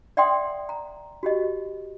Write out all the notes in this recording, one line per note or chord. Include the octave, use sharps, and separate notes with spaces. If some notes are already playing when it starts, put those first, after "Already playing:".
D5 E5 F#5 G5 C6 D#6
A#5
F#4 G4 D#5